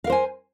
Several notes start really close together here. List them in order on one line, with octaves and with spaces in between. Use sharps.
F5 A#4 C5 G#5